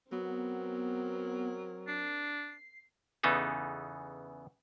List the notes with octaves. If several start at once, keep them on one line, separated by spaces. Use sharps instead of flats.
F#3 B3 C4 A#4
D4 C7
E2 C#3 E3 B3 D#4 A4